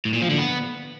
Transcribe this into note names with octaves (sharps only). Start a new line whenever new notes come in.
A2
A#2
F3
D3
B3